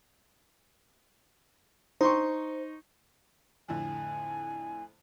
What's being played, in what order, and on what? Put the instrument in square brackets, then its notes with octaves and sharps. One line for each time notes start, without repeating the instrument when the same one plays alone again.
[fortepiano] D#4 C6 C#6 [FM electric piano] C5
[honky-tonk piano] F2 A2 D3 [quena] G#5